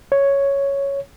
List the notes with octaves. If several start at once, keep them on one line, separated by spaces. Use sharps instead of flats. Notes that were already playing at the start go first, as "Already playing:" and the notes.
C#5